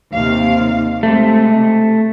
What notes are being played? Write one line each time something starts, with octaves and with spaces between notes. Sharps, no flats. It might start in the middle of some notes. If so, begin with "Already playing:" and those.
D#2 C3 F5
C3 G#3 A3